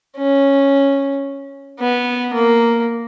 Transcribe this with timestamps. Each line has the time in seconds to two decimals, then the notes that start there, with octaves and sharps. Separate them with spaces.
0.17 C#4
1.79 B3
2.33 A#3